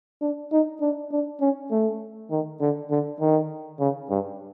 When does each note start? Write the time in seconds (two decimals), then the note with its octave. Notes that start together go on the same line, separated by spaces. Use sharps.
0.21 D4
0.52 D#4
0.81 D4
1.12 D4
1.41 C#4
1.71 A3
2.31 D#3
2.60 D3
2.91 D3
3.20 D#3
3.80 C#3
4.10 G2